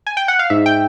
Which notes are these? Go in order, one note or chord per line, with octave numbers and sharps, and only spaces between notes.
G#5
G5
F#5
F5
G#2 E5
G5